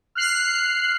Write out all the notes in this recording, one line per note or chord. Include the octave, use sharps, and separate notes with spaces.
F6 F#6 C7